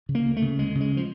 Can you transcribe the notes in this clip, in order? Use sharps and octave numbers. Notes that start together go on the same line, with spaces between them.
C#3
A#3
D2
A3
C#3
D2 G#3
C#3
G#3
F3